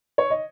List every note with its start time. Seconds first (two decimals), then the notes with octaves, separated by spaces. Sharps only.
0.18 C#5
0.30 D#5